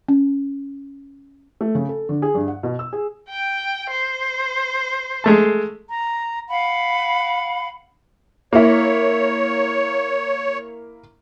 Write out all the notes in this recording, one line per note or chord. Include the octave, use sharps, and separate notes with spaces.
C#4
A3
C#3
A4
D3
G#4
G2
F#5
B2
E6
G#4
G5
C5
G#3 A3 A5
A#5
F5 F#5 B5
A#3 E4 C#5